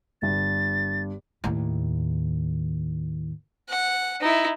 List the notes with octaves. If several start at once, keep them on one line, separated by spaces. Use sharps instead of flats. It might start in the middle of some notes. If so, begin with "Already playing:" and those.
G1 G2 A6
D#2 A2
F#5
D#4 E4